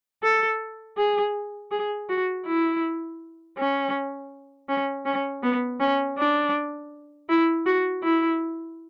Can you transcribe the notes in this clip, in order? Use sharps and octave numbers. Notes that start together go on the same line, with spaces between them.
A4
G#4
G#4
F#4
E4
C#4
C#4
C#4
B3
C#4
D4
E4
F#4
E4